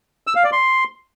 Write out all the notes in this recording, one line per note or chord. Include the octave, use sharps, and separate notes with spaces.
E6
F5
D5
C6